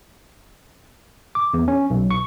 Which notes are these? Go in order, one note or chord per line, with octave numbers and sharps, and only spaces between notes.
D6
E2
C#4
B1
C#6